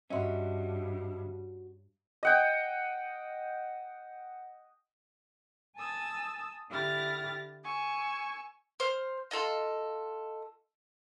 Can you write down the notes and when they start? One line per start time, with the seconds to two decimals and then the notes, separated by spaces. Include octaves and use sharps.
0.10 G2 C#4 F#4 D#5 E5 C6
2.23 D#5 F#5 G5
5.76 G#5 A5 D#6 E6 A6
6.70 D3 E4 G4 F6 A6 A#6
7.63 G#5 C#6 E6
8.80 C5 F6
9.31 F4 A4 D5 D#5